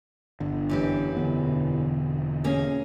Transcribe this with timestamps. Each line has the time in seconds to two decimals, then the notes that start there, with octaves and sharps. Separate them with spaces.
0.40 G1 D3
0.69 F#2 E3 G4
1.17 E1 D3 B3
2.44 A#3 C#4 G#4